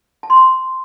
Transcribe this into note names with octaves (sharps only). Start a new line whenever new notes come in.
A5
C6
A5